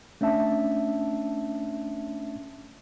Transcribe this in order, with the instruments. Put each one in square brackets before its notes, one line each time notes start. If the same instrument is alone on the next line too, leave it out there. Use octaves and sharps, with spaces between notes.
[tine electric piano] A3 C#4 D4 E5 A5